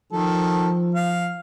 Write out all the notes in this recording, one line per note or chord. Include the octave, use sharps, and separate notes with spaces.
D#3 F3 A4
F5